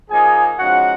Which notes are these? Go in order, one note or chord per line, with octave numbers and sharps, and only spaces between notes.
F3 A#3 D#4 G#4 G#5
C#3 F3 G#3 D#4 F#4 F#5